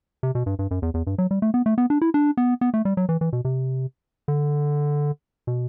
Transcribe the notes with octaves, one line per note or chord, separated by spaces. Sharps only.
C3
B2
G2
G2
F#2
E2
E2
G2
F#3
G3
A3
B3
A3
B3
D4
E4
D4
B3
B3
A3
G3
F#3
E3
E3
B2
C3
D3
B2